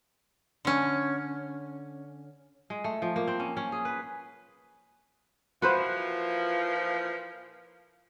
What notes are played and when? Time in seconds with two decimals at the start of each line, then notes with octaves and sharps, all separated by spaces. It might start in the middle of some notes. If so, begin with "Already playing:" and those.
0.65 D3 C#4
2.70 G#3
2.84 A3
3.02 F3
3.16 A#3
3.27 C4
3.40 C#4
3.57 C#4
3.72 G#4
3.85 B4
5.62 A#2 E3 F3 F#4 B4 C5